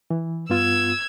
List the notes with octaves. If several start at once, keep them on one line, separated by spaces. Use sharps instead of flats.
E3
G2 B3 F4 E6 G#6